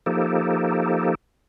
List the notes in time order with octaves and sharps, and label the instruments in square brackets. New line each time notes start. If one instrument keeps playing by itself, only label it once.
[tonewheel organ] F3 A#3 D#4 G4 A4